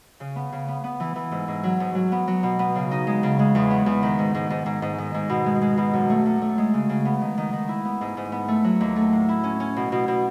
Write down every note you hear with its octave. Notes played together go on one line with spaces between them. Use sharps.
C#3
B3
C#3
B3
B3
E3
E3
G#2
G#2
F#3
G#2
F#3
B3
F#3
B2
B3
C#3
D#4
G#3
C#3
G#3
E2
B3
E2
D#3
G#2
G#2
G#2
G#2
G#2
D#3
G#2
B2
G#3
G#3
B2
F#2
A3
F#2
A3
G#3
C#3
C#3
B3
D#3
D#3
D#3
E4
B3
G#2
G#2
B3
A3
F#3
D#2
A3
A2
E4
C#4
C#4
B2
B2
B2